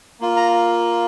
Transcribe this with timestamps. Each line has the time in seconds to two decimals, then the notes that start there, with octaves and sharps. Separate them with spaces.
0.20 A#3 F4
0.37 A#5